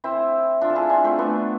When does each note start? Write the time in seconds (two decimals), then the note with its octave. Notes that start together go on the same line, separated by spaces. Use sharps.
0.04 C4 E4
0.61 D4 F4
0.70 A4
0.76 E4 G#4
0.90 D4 F4
1.04 A3 C4
1.18 B3 D4